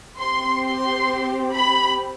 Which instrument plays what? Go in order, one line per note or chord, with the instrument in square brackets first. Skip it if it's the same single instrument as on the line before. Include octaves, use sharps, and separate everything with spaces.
[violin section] C4 G4 C6
C6
B5